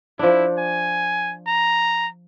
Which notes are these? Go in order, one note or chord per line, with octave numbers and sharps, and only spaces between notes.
F3 D4 E4
G#5
A#5